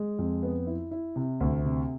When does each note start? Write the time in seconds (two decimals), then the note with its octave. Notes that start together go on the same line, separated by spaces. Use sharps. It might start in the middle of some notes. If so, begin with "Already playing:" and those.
Already playing: G#3
0.19 F2
0.43 B3
0.67 E4
0.91 E4
1.16 C3
1.41 D2
1.65 C3